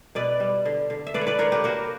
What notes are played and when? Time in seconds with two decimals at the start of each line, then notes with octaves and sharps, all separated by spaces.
0.15 B2 B4 D5
0.40 G3
0.65 D3
0.90 D3
1.07 E5
1.14 D3 B4 D5
1.21 C#5
1.27 B4 D5
1.39 D3 A#4 C#5
1.52 G4 B4
1.64 A#3 F#4 A#4